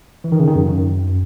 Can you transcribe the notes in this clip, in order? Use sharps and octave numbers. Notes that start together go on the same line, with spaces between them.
E3
D#3
C#3
D#3
F#2